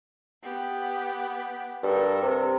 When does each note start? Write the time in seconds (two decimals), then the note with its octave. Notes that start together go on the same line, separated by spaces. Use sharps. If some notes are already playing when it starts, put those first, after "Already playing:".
0.43 B3 G4
1.83 G2 A4 A#4
2.22 C3